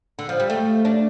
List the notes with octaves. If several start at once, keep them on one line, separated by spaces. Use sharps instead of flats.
D3
F3
G3
A3
D4